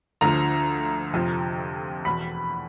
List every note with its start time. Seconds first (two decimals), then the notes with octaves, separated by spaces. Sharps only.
0.21 D2 D3 F3 A#5
1.14 F2 C3 F3
2.05 E2 B2 B5